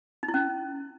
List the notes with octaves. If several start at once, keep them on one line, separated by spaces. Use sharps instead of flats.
D#4
E4
C#4